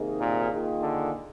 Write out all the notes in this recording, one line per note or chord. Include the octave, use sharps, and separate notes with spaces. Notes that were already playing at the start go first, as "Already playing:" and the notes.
Already playing: C3 D#3 A#3 D#4 G#4
A#2
D#3 A#3 F4 G#4
D3